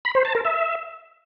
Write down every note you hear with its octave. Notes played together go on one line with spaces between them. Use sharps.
B5
C5
A5
A#4
E5